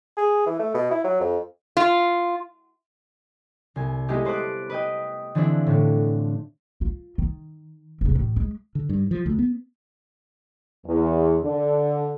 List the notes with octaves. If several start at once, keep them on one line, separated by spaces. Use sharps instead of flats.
G#4
E3
A3
B2
E4
F#3
F2
F4
C2 G#5
G#3 A3 B3 E4 G4 D#5
B4 C5 A5 D6 F#6
B4 D#5 G5
D3 E3 F3 C4 D4 E4
A2 D3 A3
F4
D#3
D#1 C#3
A1
G#3
D3
G2
F3
D2
B3
E2
D3